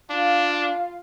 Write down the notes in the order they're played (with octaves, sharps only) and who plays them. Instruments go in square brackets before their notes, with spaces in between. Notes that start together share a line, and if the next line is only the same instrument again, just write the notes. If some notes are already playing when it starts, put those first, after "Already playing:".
[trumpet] D4 [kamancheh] F4 F5